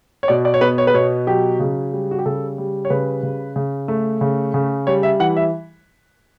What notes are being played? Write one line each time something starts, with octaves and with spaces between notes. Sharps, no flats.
C#5
B2 D5
D5
C#5
B3 B4
C#5
B4
B2 C#5
F#3 G4
C#3
G3
F#4
G4
C#3 A4
G3
C#5
C#3 B4
C#3
C#3
A3
C#3
C#3
G3 C#5
E5
E3 F#5
E5